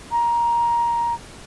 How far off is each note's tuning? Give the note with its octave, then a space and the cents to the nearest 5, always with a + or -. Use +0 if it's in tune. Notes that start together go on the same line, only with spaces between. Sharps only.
A#5 +15